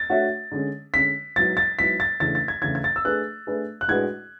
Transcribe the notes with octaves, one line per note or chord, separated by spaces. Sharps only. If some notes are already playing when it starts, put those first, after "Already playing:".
Already playing: A6
A3 D4 F#4 C#5 E5
D3 G#3 C#4
D3 G#3 C#4 B6
G#2 F#3 B3 E4 A6
A6
G#2 F#3 B3 E4 B6
A6
E2 C#3 E3 A3 D4 A6
A6
G#6
E2 C#3 E3 A3 D4 G#6
G#6
A6
E6
A3 D4 G#4 B4 F#6
A3 D4 G#4 B4
F#6
A2 G#3 D4 F#4 B4 G#6